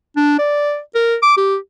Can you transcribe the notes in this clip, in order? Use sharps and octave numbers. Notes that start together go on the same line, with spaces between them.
D4
D5
A#4
D6
G4